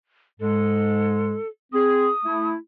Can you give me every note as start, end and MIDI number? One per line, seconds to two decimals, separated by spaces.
0.40 1.35 44
0.40 1.35 56
0.40 1.48 69
1.73 2.08 60
1.73 2.08 68
1.73 2.49 87
2.24 2.55 57
2.24 2.55 64